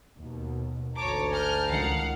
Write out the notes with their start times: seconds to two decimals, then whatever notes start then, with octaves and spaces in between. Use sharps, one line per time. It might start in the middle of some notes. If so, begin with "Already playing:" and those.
0.18 D#2 B2
0.96 G#1 D2 C#5 A5 A#5 D6
1.32 G#5 F6 G6
1.67 C#2 D#3 F5 F#5